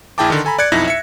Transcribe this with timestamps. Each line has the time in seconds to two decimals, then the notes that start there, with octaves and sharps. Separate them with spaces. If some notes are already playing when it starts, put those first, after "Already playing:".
0.18 A#1 E4 G#4 G5 A5 D6
0.30 D3 D#3
0.45 A4 G#5 A#5 B5
0.58 D5 F#6 G#6 C#7
0.72 B1 F2 D#4 E4 A#6
0.88 E5 C#7